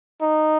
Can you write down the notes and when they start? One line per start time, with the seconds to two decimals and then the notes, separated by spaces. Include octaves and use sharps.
0.22 D#4